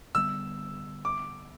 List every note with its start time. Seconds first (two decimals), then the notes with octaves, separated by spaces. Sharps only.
0.15 D3 G3 B3 E6
1.05 D6